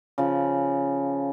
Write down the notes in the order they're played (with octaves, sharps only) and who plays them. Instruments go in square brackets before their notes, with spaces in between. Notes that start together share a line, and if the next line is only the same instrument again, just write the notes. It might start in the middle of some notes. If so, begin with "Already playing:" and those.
[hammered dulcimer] C#3 F3